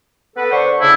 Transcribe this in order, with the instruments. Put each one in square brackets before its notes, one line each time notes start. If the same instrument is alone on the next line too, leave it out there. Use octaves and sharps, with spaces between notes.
[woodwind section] B3 A4 B4
D3 C5 C#6
[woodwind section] C#3 D4 [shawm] E4